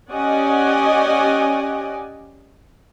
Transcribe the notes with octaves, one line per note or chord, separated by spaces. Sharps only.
C#4 G4 D5 D#5 F#5 G#5